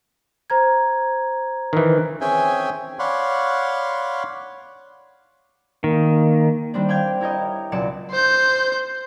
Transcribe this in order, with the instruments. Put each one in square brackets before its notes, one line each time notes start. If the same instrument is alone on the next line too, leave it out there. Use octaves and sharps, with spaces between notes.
[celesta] C5 A#5 G#6
[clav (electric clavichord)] D#3 E3
[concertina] C4 C#4 G#4 E5 G5 G#5
C#5 D5 F5 F#5 B5 C6
[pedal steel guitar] D#3 [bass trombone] A#3
[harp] D#3 G3 C4 D4
D5 F5 G5 F6 G#6
E4 G4 A#4 C#5 D#5
C#2 B2 F#3 D5 C#7 E7
[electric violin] C5 G6